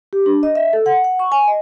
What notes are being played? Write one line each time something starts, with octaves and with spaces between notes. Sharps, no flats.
G4
D4
D#5
E5
A4
F#5
F#5
C#6
G#5
D#5